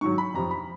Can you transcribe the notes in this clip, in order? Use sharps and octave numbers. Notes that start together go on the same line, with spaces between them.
G#2 D#3 F#3 C#6
B5
F2 C3 F3 A#5
B5